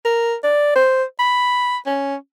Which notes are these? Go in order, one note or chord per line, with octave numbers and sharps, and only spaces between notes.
A#4
D5
C5
B5
C#4